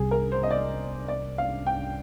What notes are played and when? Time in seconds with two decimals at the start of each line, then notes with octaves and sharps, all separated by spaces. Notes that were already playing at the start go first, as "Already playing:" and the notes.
Already playing: C2 C3 G3 G#4
0.11 A#4
0.32 C5
0.43 D#5
0.51 D5
1.08 D5
1.38 F5
1.66 G5